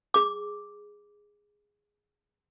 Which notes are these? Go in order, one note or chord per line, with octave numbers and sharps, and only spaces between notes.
G#4 D6